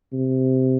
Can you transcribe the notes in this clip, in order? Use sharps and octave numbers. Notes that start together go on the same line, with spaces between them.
C3